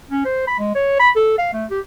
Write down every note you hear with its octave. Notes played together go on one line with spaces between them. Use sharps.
C#4
C5
B5
G#3
C#5
B5
A4
F5
A3
G4